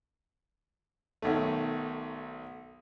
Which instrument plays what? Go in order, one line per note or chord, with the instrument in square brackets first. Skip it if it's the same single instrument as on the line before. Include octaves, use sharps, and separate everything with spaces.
[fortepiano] B1 D#3 A3